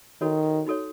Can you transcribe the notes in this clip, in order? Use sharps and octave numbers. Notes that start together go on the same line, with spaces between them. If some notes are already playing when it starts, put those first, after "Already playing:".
D#3 D#4 F#4 A4 C#5
D#4 F#4 A4 C#5